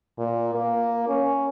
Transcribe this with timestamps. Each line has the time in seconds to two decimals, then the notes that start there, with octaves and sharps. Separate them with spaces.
0.19 A#2
0.54 A#3
1.08 C#4